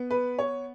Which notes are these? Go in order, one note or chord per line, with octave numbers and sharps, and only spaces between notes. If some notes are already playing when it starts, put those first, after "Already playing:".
Already playing: B3
B4
C#5